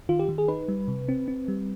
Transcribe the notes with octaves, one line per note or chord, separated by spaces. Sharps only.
D#3 F4
G4
D#3
G#4
D#4 B4
G3
C3
C4
C4
G3